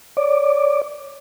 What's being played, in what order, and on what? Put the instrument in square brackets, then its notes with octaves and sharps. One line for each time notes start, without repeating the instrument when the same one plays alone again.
[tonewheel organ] C#5 D5 D6